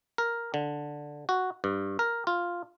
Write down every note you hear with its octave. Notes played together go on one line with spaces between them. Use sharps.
A#4
D3
F#4
G2
A#4
F4